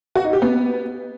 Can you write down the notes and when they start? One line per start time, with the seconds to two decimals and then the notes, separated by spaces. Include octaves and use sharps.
0.15 F#4
0.24 D#4
0.33 G4
0.42 B3